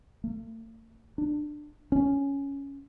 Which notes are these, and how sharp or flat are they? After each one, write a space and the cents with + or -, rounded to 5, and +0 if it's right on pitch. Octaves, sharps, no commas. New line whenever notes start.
A3 +45
D4 +20
C#4 +5